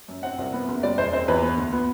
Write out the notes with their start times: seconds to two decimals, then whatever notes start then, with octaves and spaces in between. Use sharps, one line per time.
0.08 F#2
0.23 C4 F#5
0.38 C2
0.53 B3
0.68 F#1
0.83 G3 D5
0.98 E1 C5
1.13 C4 C5
1.28 E2 B4
1.43 B3
1.58 D2
1.73 B3